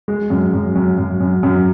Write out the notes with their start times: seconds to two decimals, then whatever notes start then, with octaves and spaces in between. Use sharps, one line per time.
0.08 G#3
0.30 F#2
0.53 F#2
0.76 F#2
0.98 F#2
1.21 F#2
1.43 F#2